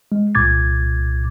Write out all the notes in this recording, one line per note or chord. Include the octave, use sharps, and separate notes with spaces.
G#3
C2 A#2 D6 G#6 A6